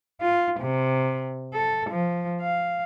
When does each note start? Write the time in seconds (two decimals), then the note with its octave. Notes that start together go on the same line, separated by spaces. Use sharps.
0.21 F4
0.60 C3
1.53 A4
1.90 F3
2.41 F5